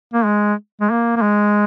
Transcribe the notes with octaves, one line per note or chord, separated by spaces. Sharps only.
A#3
G#3
G#3
A#3
A#3
G#3